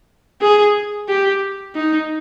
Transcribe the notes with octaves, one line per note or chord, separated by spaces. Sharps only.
G#4
G4
D#4